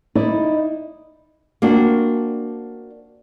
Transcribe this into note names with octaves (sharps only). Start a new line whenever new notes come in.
D#4 E4 D5
A#3 C4 D4 F#4